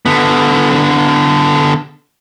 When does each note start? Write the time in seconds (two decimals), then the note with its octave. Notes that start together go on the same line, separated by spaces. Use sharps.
0.06 D3 B3